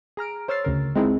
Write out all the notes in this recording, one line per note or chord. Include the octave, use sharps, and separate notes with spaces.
G#4 A#5 F6 D7
C5 C#5 E6 F6 A6 C7
D2 C#3 A#4
G#3 C4 D#4 E4 G#4